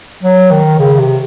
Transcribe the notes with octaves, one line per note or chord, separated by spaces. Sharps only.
F#3
D#3
C#3
C3